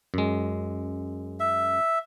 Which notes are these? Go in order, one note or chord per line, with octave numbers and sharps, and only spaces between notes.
F#2 G#3
E5